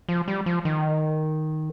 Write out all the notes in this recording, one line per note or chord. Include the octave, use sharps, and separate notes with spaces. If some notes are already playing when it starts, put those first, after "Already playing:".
F3
G3
F3
D#3